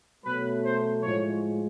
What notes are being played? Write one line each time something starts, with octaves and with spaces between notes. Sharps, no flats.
B2 F#3 A3 B4
C5
A2 F3 G#3 C#5